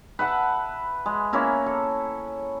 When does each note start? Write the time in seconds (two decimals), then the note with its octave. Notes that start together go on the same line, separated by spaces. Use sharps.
0.19 B4 E5 F#5 A5
1.06 G#3
1.33 A#3 C#4 E4 A#4
1.66 A4